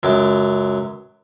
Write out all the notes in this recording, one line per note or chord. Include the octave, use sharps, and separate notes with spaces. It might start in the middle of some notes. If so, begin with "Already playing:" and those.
C#2 F#2 D6